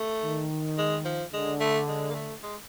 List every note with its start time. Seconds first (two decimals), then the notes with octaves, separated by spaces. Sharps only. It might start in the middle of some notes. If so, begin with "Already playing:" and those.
Already playing: A3
0.24 D#3
0.78 G#3
1.05 F3
1.33 D3 G#3
1.60 A3
1.88 G#3
2.10 A#3
2.15 A3
2.43 G#3